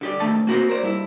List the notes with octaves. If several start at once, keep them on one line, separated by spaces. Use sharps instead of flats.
D3 G4 D5
D#3 A3 A5
A#3 C4 F#4 G#4 A#4 C5
A#4 C5 D5
G2 E4